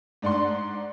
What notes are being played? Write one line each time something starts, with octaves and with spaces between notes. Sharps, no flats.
G#2 D4 D5 F#5 C6